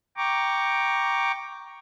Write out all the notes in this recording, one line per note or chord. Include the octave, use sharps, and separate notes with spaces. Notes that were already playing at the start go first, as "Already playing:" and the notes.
G5 A#5 C#6 D6